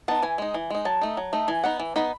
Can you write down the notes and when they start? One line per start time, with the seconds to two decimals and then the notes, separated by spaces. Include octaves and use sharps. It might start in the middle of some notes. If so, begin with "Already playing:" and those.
0.08 B3 D#4 A5
0.23 E3 G#5
0.38 G#3 D#4
0.54 E3
0.70 G#3 D#4
0.85 F#3 A5
1.01 A3 D#4
1.17 F#3
1.33 A3 D#4
1.48 E3 G#5
1.64 B3 D#4 F#5
1.80 E3
1.96 B3 D#4 B5